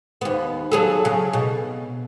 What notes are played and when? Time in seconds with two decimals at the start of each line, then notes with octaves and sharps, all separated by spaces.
0.21 D#2 B3
0.72 F#3 G#4 A4
1.05 C#3
1.33 B2